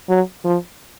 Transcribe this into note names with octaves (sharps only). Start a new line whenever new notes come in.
F#3
F3